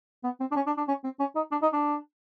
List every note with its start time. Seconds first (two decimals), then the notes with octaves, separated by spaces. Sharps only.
0.24 B3
0.40 C4
0.51 D4
0.56 C#4
0.66 D4
0.77 D4
0.88 C#4
1.04 C4
1.20 C#4
1.35 D#4
1.51 D4
1.62 D#4
1.73 D4